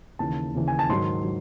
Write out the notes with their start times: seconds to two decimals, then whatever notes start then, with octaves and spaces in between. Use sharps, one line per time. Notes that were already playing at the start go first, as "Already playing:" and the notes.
0.19 D#2 C#3 E3 A5
0.54 D#2 C#3 E3
0.68 G#5
0.79 A5
0.89 G#2 D#3 F#3 C6
1.25 F#3